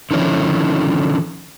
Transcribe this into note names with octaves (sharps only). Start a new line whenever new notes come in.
D3 D#3 F3 C#4 E4